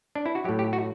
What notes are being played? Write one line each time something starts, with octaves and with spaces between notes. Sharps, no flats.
D4
E4
F#4
A2 F#3 G4
G4
F#4